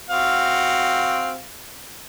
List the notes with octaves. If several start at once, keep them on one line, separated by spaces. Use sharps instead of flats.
C4 F#4 F5